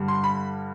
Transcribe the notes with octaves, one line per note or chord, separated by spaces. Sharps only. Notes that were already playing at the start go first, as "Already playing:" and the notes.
Already playing: G2 D3 G3
C6
B5